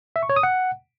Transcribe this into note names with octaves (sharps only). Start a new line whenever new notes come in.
E5
C#6
C#5
D#6
F#5